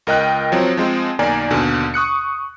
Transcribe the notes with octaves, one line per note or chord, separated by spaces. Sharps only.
C#2 A#4 D#5 G5 F#6
F3 F#3 C4
F3 G#3 C4
B1 D#3 A#3 D5 G#5 A#5
D#2 B2 D3
C#6 D#6 F#6 C#7